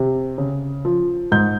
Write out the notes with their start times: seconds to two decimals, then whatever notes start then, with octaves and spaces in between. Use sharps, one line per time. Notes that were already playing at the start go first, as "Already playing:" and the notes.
Already playing: C3
0.38 C#3
0.85 F3
1.32 G#2 G6